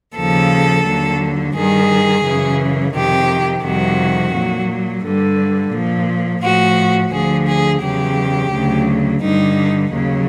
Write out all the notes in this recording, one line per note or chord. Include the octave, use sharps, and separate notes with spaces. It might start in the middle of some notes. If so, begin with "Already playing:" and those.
D#2 C#3 F3 A4
D#2 D3 F#3
G2 D#3 G3 G#4
F#2 C#3 E3
F2 C3 D#3 G4
F2 C3 D#3 G3 F#4
A#2 F#3
G2 D3 G3
A#2 F3
A2 F3 F#4
D2 D3 F3 G#4
G#4
E2 C#3 F#3 G4
D2 C#3 F#3
G2 D3 G3 D#4
D#2 C#3 F#3